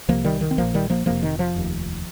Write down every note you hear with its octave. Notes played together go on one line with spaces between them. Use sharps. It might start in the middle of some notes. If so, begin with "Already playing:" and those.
C2 C3 F3 A#3
D#3 G3
D#3
C4
A#1 A#2 F3 A#3
D#3 G3
F3 A#3
F1 F2 C3 F3 A#3
D#3
F3
F1 D#2